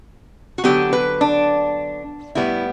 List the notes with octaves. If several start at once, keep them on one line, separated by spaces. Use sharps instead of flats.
F#4
D3 F#3 B3 G4
B4
D4
A2 G3 B3 E4